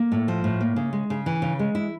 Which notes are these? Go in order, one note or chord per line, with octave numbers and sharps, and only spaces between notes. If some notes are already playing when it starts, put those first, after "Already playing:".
Already playing: A#3
A2
F3
A2
A#3
C#3
G#3
C#3
E3
C#3
G#3
E4